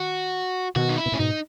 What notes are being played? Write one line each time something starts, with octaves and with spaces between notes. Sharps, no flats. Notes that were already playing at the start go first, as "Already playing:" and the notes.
Already playing: D#3 F#4
B2 D#3 F#4
D#4
E4
B2
A#2 C#4
G#2 B2 D#4